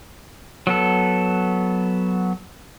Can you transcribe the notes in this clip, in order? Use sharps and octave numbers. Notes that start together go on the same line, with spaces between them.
F#3 B3 A4